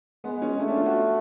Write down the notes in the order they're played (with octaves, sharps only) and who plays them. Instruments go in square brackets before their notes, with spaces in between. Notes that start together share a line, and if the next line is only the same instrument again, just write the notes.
[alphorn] G#3 [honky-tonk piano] B3
[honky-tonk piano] C#4
[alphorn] A3 [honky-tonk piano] C#4
[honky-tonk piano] D4
F4
F#4